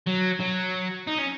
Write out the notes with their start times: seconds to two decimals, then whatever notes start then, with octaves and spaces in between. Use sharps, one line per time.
0.07 F#3
0.40 F#3
1.07 D#4
1.18 C#4